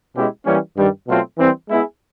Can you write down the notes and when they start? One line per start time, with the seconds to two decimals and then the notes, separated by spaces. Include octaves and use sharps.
0.15 B2 G#3 C#4 E4 G4
0.45 E3 G3 A#3 C#4
0.76 G2 D#3 G3
1.07 B2 F#3 A3 C4 F4
1.38 E3 G3 C4
1.68 G#3 B3 E4 G#4